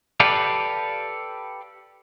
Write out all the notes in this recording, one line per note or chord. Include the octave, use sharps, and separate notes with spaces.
G4 A4 B4 D5 F5